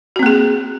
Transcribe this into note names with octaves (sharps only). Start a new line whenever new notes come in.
A#3 C4 F#4 G#4